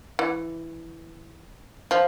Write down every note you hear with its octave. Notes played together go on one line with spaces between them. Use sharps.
E3
F3